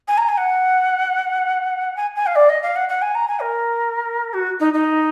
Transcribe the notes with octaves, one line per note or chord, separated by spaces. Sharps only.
G#5
A#5
G#5
F#5
G#5
G#5
F5
D5
D#5
F5
F#5
F#5
G#5
A#5
G#5
A#4
F#4
D#4
D#4